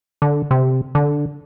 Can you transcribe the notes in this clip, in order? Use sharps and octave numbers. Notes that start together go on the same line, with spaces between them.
D3
C3
D3